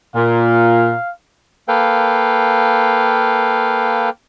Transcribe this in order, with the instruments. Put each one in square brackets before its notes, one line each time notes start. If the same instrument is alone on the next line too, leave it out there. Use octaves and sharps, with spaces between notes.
[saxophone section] A#2 [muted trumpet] F5
[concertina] A#3 A4 B4 F5 G5